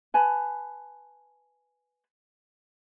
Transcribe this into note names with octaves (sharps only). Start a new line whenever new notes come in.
B4 G#5 A5 B5